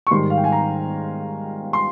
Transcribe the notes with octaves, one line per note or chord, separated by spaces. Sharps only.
C#6
G#2 D#3 G3 C6
F5
G5
G#5
A#5
C6